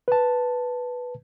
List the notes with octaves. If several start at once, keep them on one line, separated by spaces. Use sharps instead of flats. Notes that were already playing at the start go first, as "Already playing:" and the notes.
B4 A5